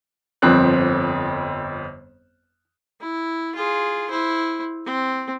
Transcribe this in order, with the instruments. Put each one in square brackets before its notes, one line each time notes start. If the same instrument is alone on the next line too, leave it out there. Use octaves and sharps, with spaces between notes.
[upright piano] G1 F2 C4 F#6
[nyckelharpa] E4
F4 G#4
E4 C5
C4